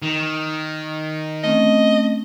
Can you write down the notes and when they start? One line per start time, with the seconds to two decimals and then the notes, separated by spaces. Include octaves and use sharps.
0.02 D#3
1.44 A3 C4 C#4 D#5